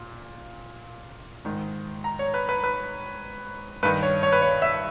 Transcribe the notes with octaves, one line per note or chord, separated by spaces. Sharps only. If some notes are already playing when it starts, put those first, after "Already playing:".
Already playing: A#2
G#2 D#3
A#5
C#5
B4
B4
B4
G2 D#3 B4
C#5
C#5
B4
C#5
E5